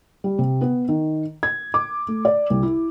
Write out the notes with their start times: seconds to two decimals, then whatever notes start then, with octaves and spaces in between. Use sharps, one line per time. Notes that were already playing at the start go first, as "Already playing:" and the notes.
0.24 G3
0.39 C3
0.61 B3
0.89 D#3
1.43 G#6
1.74 D6
2.08 A3
2.25 D5
2.50 C2
2.63 E4